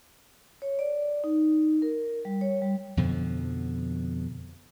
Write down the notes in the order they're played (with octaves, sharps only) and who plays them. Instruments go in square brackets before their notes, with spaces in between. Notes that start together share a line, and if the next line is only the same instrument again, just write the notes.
[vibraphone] C#5
D5
D#4
A#4
G3
C#5
G3
[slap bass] F2 B2 D3 F3